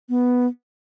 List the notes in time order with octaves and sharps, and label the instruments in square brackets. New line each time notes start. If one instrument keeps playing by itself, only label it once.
[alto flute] B3